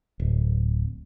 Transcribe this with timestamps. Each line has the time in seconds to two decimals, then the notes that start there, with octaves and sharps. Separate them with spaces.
0.20 D1